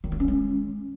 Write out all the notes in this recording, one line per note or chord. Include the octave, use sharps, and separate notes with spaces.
D#3
A#3
C#4
G#3